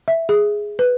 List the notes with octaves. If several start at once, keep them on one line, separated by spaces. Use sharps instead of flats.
E5
G#4
B4